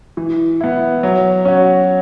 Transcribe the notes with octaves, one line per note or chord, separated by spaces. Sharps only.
E3
B3 E4
F#3
C#4 F#4